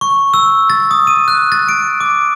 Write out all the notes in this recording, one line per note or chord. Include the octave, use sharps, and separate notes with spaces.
C#6
E6
A6
D#6
D#7
F#6
A6
D7
D6